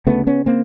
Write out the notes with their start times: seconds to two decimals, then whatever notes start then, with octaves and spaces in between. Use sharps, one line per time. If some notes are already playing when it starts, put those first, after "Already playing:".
0.07 D2 C#3 A3 B3
0.27 B3 C#4
0.46 A#3 C4